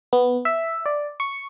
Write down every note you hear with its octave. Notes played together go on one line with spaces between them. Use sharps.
B3
E5
D5
C#6